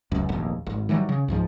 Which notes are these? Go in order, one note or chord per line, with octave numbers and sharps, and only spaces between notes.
E1 C#2 F#2
F1 A#1 D#2
G#1
D#3 E3 F#3 G3
C#3
C#2 G#2 F3